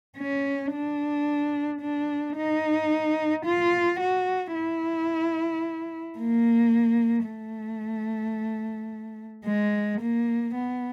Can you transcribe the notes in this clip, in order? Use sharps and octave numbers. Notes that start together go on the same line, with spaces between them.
C#4
D4
D4
D#4
F4
F#4
E4
A#3
A3
G#3
A#3
B3